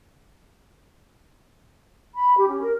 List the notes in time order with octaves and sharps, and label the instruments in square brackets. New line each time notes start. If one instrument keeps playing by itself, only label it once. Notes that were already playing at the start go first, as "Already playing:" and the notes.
[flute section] B5
G4
C#4
A#4